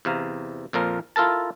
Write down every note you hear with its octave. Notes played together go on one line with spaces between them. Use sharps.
E2 C3 F5 A#5
F2 A#2 F3 A#4
E4 F4 A4 A#4 A5